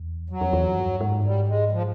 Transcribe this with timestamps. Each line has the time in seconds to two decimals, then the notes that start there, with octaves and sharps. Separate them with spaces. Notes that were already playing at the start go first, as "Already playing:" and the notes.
Already playing: E2
0.30 F2 F#3
0.41 F2
0.53 E2
0.65 F#2
0.77 G2
1.01 G#2
1.24 G3
1.48 G#3
1.72 F3